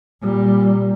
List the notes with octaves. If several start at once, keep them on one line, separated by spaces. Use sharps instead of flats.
A#2 G3